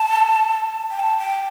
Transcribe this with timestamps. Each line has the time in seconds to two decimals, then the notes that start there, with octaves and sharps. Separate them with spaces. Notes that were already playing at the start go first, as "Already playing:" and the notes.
Already playing: A5
0.91 G5
1.00 A5
1.19 G5